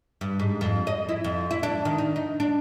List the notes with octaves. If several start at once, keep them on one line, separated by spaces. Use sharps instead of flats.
G2
G#2
F2
D#5
E4
F2
E4
D4
D#3
D#4
D#4
D4